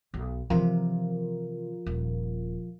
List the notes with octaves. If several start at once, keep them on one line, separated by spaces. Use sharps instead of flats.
B1
C3 E3 F3 F4 A#4
D#1